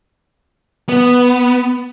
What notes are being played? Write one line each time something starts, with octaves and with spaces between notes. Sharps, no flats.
B3